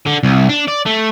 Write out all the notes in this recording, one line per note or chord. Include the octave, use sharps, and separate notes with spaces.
D3
C2
D4
D5
A3